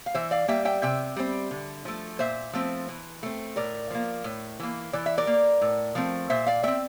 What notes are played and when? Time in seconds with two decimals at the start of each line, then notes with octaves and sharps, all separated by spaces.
0.06 F5
0.14 E3 C5 E5
0.31 D5 F5
0.48 G3 A#3 E5 G5
0.65 E5 G5
0.82 C3 E5 G5
1.16 G3 C4
1.51 D3
1.85 F3 A3
2.19 A#2 C5 E5
2.53 F3 A3 C4
2.89 E3
3.23 A3 C4
3.56 A2 A#4 D5
3.90 F3 A#3
4.24 A2
4.60 E3 A#3
4.93 E3 D5
5.06 E5
5.17 A#4 D5
5.27 A#3
5.61 A2
5.95 F3 A3 C4
6.30 A#2 C5 E5
6.46 D5 F5
6.63 A3 C4 E5 G5